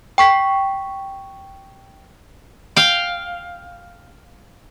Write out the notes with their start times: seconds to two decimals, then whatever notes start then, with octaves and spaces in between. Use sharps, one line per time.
0.18 G5 C#6 B6
2.76 F5 G5